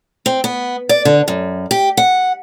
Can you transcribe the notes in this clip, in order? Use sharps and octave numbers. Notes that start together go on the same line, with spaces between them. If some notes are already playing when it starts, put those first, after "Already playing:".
C4
B3
D5
D3
F#2
G4
F#5